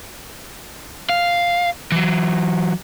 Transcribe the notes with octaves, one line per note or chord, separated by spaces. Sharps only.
F5
E3 F#3